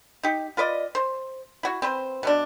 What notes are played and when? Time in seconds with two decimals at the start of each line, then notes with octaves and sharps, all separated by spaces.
0.23 D#4 G4
0.57 F4 B4 D5 D#5
0.95 C5
1.63 E4 F#4
1.82 C4 B4 C5
2.23 B2 C#4 D4